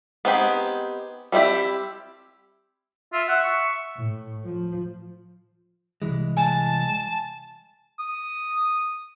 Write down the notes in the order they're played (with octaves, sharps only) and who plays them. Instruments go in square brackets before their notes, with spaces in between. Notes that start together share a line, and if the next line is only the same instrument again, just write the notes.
[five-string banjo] B3 C4 D#4 G4 G#4
G3 C4 E4 G4 E5
[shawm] F4 [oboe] E5
[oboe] E5 [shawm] F#5
[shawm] C#6
[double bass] A2
F3
[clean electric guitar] C2 E3 G#3
[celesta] G#5 [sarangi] A5
[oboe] D#6